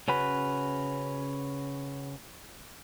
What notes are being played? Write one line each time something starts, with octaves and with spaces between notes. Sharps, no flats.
C#3 C#4 F#4 B4